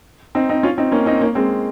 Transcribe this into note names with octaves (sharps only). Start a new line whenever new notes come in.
C4 D#4
C4 D#4
C#4 F4
C4 D#4
A#3 C#4
C4 D#4
A#3 C#4
G#3 C4